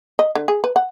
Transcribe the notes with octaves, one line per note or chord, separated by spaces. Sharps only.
D#5
D3
G#4
B4
F#5